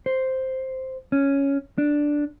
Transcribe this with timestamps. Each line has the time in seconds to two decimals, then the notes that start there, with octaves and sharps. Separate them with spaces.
0.06 C5
1.12 C#4
1.78 D4